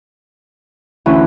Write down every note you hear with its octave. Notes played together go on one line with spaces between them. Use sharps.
D2 E3 C#4 E4